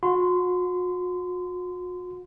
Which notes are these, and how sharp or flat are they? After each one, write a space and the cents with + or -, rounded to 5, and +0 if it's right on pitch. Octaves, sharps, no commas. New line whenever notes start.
F#4 -40 C6 -30